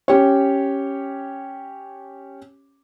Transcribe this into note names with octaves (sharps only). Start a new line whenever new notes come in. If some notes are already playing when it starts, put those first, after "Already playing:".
C#4 G4 C#5